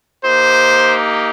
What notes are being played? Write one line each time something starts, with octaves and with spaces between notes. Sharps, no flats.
A#3 D#4 G4 C5